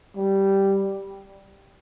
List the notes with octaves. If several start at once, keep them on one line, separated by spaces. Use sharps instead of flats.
G3